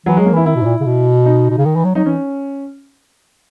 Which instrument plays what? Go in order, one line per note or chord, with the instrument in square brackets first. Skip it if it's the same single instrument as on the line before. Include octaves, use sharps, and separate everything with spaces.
[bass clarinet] E3 [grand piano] F#3
[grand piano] G#3
[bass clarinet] F#3
[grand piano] A#3
[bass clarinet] E3 [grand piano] E4
[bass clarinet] D#3 [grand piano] E4
[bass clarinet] B2
G#2
A#2
C#3
B2
[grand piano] D#4
[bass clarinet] B2
C#3
D#3
E3
F#3
[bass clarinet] F#3 [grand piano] D#4
[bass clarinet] E3 [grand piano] C#4